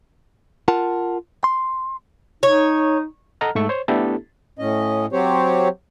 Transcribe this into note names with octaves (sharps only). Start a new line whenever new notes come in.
F4 A#4 F#5 A5
C6
D#4 C#5
A4 D#5 F#5 A#5 F6
G#2 A3 C#6 E6
C5 C#5
A3 B3 D4 E4 G4 A4
A2 C#4 D#5
F#3 C4 G4 C5 C#5